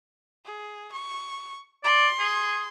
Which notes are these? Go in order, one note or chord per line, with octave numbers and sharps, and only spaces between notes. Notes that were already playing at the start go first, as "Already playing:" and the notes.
G#4
C#6
D5 C6
G#4